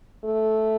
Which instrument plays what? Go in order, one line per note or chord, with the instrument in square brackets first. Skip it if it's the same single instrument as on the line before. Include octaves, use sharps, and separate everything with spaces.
[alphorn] A3